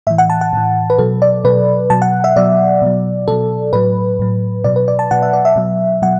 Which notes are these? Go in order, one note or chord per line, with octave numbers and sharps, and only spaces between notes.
A2 E3 E5
F#5
A5
F#5
A2 E3
B4
B2 F#3 A4
D5
B2 F#3 B4
B2 F#3 A5
F#5
E5
B2 F#3 D5
B2 F#3
B2 F#3 A4
A2 F#3 B4
A2 F#3
B2 F#3 D5
B4
D5
A5
B2 F#3 F#5
E5
D5
E5
B2 F#3
B2 F#3 F#5